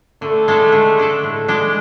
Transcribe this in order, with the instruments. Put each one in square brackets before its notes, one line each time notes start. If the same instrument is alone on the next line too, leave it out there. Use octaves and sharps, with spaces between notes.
[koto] D3 [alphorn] A3
[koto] G#3 D4 A4
D3
G#3 D4 A4
[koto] A2 [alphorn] A3
[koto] G#3 D4